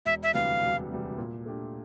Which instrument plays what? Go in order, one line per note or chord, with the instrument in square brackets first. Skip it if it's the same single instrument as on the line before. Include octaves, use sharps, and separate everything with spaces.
[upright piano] E1 [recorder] E5
[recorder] E5
[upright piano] D2 C3 E3 G3 [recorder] F5
[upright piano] E1
D2 C3 E3 G3
A#2
A3 D4 G4